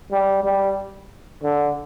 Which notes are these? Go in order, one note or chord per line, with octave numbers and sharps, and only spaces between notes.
G3
G3
D3